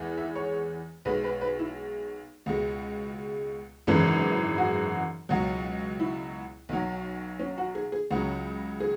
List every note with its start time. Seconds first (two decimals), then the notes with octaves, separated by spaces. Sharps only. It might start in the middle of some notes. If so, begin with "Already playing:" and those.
Already playing: E2 E3 G#3
0.17 E5
0.36 C#5
1.05 B1 B2 G#3 B4
1.24 B4
1.41 B4
1.59 E4
2.46 C#2 B2 G#3
3.87 G#1 F#2 C#3 E3 G#3
4.58 F#4
5.29 C#2 B2 F#3
6.00 E4
6.69 B1 B2 F#3
7.39 C#4
7.58 F#4
7.75 G#4
7.92 G#4
8.11 C#2 C#3 F#3 F#4
8.80 G#4